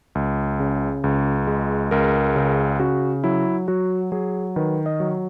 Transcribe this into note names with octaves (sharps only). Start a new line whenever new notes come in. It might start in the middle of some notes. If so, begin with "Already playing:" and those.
C#2
C#3
C#2
G#3
C#2 A#4
C#3
C#3 F#4
F#3 E4
F#3 F#4
F#3 G#4
D#3 B4
D#5
F#3